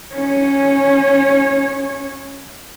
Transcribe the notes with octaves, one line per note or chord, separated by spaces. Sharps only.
C#4 C#5